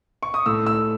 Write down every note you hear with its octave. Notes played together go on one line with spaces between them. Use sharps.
C#6
D#6
A2 E6
E6